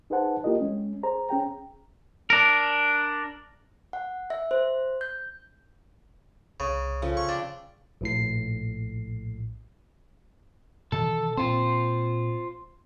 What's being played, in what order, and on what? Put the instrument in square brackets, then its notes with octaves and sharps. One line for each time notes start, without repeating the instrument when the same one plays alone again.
[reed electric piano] D#4 G#4 B4 C5 F#5 A5
A#3 E4 F4 G4 A#4 D#5
G#3 C#4
G#4 C5 A#5
C#4 G#4 G5 A#5
[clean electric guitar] D4 A#4
[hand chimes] F#5
E5
C5
G6
[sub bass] C2 [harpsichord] C#3
[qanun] C#3 F3 A4
[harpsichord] C#6
[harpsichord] D4 [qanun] G5
[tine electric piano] A#1 A2 C7
[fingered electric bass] B2 D#3 E3 [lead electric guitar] A4
[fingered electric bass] A#2 C4 [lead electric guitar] F4 C5